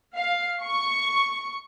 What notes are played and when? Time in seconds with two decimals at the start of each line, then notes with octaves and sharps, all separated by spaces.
0.17 F5
0.62 C#6